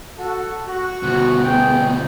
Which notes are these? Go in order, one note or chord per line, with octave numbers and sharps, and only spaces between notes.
F#4 A4
F#4
D2 B2
B3 G#4 G5